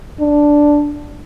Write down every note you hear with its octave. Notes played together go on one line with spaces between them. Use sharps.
D4